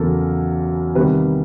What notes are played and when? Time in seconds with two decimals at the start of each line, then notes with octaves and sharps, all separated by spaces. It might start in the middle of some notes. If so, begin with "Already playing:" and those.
Already playing: E2 C#3 F#3 A4 A#4
0.95 C3 D#3 G3 B3 B4